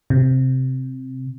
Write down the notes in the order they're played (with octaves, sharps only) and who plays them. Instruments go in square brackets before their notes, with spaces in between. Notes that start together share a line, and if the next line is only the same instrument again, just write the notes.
[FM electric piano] C3